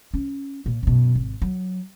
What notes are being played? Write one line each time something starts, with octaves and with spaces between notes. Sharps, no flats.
C#4
A#2
F#2 B2
G#1
F#3